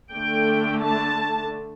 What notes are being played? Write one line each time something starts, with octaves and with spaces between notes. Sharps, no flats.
D3 A3 D4 G5
A5